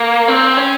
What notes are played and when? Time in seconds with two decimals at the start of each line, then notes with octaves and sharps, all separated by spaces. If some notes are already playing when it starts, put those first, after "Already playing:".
Already playing: A#3
0.28 C4
0.57 C#4